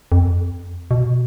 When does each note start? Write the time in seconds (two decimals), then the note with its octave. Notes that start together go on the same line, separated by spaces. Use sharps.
0.12 F2
0.91 B2